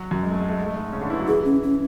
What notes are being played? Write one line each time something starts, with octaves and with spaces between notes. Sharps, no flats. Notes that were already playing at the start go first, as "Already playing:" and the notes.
Already playing: F#3 F#4
F#2 F#3
G#3
A3
G#3
A3
G#3
A3
G#2 G#3
C#3 C#4
D3 D4
E3 E4
F#3 F#4
E3 E4 G#4
C#4
C#4